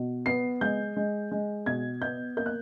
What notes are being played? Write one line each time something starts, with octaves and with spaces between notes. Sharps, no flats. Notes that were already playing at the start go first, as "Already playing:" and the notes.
Already playing: B2
B3 C7
G#3 G6
G#3
G#3
B2 G#6
B3 G6
A#3 G6
F#6